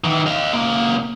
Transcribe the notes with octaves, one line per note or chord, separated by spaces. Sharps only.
D#3 E3
D#5 F5
C#2 A#3